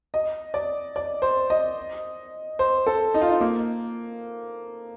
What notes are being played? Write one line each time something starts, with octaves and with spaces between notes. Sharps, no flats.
D#5
D5
D5
C5
D#5
C5
A4
D#4
F4
D#4
A#3